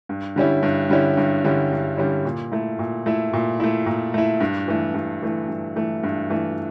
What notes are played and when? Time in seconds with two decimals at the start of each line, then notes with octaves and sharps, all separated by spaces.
0.09 G2
0.36 D3 G3 C#4 E4
0.63 G2
0.90 D3 G3 C#4 E4
1.17 G2
1.44 D3 G3 C#4 E4
1.71 G2
1.97 D3 G3 C#4 E4
2.25 A#2
2.52 A3 E4
2.79 A#2
3.06 A3 E4
3.33 A#2
3.60 A3 E4
3.86 A#2
4.14 A3 E4
4.40 G2
4.68 E3 A3
4.94 G2
5.22 E3 A3
5.48 G2
5.76 E3 A3
6.03 G2
6.30 E3 A3